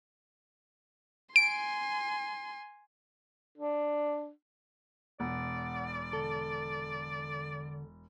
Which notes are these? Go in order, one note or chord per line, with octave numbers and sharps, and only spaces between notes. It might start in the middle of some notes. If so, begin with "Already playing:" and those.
G#5 C6 D7
D4
E1 D5 F#5
D3 A4